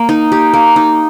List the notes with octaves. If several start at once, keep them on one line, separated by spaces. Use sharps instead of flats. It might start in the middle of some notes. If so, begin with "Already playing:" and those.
Already playing: A#3
D#4
G4
A#3
D#4